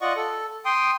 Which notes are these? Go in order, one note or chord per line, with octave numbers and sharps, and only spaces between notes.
F4 D5 D#5 F#5 C#6
A4
G5 C6 D#6